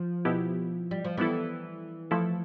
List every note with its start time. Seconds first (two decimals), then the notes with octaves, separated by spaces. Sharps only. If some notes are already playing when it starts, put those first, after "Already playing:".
Already playing: F3
0.25 B2 B3 E4 G4
0.91 G3
1.05 F3
1.17 E3 G3 B3 E4 A4
2.11 F3 A3 E4 A4